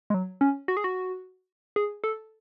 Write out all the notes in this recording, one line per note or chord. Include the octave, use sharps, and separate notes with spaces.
G#3
F#3
C#4
F#4
G#4
F#4
G#4
A4